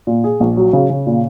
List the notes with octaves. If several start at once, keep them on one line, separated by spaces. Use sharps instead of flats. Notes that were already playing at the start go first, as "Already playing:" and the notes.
A#2
G#4
A#1
F#3
C#3
C#3
A#2